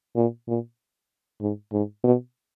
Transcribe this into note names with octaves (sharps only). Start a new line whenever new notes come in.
A#2
A#2
G#2
G#2
B2